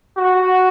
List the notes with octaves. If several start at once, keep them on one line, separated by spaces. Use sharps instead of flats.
F#4